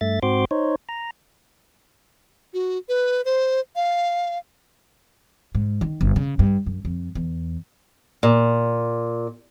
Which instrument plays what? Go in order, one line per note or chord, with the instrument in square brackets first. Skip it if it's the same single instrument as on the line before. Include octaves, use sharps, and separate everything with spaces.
[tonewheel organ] G2 A3 E5 A6
G#2 C4 F#4 C5 C6 D6
D#4 C5 C#5
A#5
[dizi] F#4
B4
C5
F5
[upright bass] G#2
D#3
G1
C#3
G2
F#2
F2
E2
[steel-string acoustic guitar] A#2